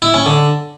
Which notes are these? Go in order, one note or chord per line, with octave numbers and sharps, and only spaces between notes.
E4
C#4
D3